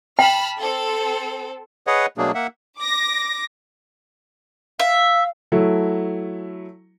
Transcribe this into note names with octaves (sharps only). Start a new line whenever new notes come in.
G5 A5 B5 F6
C4 A4
G#4 B4 C#5 D#5 F#5
B2 F#3 A3 A#3 D4 G#4
A#3 E5 F#5
D6 A#6
E5 F5
F#3 A3 E4